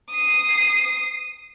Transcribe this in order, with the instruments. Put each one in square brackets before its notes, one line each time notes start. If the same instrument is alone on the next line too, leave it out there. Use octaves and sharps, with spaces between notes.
[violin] D#6 C7